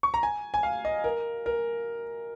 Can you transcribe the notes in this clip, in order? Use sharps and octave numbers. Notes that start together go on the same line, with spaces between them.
C#6
A#5
G#5
G#5
F5
D#5
A#4
A#4